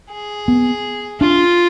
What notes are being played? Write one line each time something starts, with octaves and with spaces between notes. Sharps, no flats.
G#4
B3
D4 F4